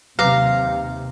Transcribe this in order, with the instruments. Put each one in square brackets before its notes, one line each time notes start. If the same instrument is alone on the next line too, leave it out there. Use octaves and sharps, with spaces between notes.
[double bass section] D#2 C3 [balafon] F#3 B4 D6 [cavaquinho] F5 A#5